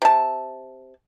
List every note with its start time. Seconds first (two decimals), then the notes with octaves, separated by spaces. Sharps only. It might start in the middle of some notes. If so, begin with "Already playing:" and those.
0.02 C3 A5